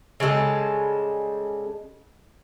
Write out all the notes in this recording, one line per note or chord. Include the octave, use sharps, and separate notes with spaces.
C#3 G3 G#3 A4